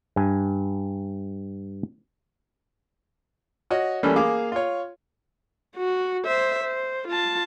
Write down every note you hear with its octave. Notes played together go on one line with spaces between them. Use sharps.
G2 G#5
F#4 C#5 D#5
E3 G3 A3 A#3 C#4
A#3 G#4 F5 D6
F4 C#5
F#4
C5 E5
C5
F4 A5